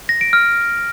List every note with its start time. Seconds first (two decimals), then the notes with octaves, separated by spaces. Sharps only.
0.09 A#6
0.21 D7
0.33 F6